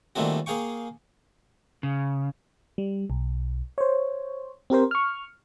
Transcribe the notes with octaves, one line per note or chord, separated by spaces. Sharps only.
A#2 D#3 G3 A3 C4 F#4
A#3 G#4 F5 G5 C#6
C#3
G3
B1
C5 C#5
C4 G4 A#4 C5
C#6 F6